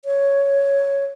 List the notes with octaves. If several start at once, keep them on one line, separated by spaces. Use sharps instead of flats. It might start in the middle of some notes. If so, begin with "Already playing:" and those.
C#5